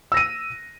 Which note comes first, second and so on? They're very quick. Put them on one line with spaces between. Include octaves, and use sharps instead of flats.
E6 A#6 D#7